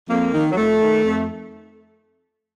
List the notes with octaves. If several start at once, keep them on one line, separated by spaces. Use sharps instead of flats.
F2 A#3
D#3
F#3
F2 A3
D#3
F2